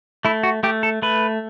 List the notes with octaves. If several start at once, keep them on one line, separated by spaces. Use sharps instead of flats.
A3 E4
F#4
A3 G4
A4
A3 B4